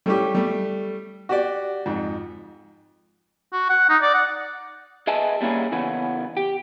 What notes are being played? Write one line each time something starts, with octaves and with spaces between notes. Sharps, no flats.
G3 A3 C#4 E4 G4
G3 A3
F#4 G4 D5
F2 G#2
F#4
F#5
D#4
D5
F#5
G#4 B4 D#5 E5 G#5 A5
G3 A#3 C#4 E4 G#4
C#3 E3 B3 C#4
G4